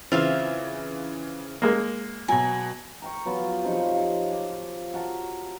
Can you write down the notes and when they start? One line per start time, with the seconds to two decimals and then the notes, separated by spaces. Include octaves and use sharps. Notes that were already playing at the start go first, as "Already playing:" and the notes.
0.12 C#3 E3 C4 F4 E5 F5
1.62 G#3 A#3
2.28 B2 F#3 G#5
3.02 A#4 G5 C#6
3.26 F#3 B3 F4 G4
3.64 C3 F3 D#4 C#5
3.93 C#5 F5
4.32 D6
4.94 F#4 A#4 A5